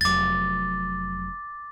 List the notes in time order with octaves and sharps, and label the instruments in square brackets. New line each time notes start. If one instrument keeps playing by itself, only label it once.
[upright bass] F1 F#3 [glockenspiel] D6 A6